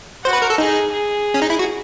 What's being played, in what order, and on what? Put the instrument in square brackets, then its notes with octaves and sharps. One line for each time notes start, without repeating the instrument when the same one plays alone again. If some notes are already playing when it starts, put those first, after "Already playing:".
[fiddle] F#4 [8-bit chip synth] C5
[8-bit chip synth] B4
A#4
A4
[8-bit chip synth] D#4 [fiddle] G#4
[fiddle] G#4
[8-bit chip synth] C#4
D#4
E4
F#4